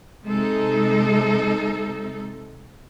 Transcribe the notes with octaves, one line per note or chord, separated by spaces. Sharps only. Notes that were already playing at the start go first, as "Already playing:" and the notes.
C3 G#3 D#4 A4